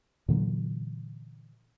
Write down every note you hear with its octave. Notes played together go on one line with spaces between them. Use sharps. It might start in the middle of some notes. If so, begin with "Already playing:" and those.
A#2 D3 E3 F#3